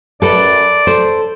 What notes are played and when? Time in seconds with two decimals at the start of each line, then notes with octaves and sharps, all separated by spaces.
0.22 F#2 A4 B4 D5
0.87 A4 C5